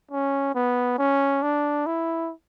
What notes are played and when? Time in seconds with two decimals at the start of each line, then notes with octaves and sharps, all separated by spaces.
0.11 C#4
0.55 B3
0.98 C#4
1.42 D4
1.86 E4